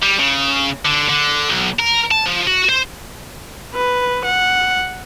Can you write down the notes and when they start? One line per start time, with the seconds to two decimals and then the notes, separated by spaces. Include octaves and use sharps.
0.02 G3
0.19 C#3
0.85 D3
1.09 D3
1.50 B1
1.80 A#4
2.11 A5
2.26 F3
2.47 F#4
2.69 C5
3.74 B4
4.25 F#5